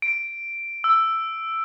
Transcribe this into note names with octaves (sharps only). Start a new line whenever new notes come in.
D7
E6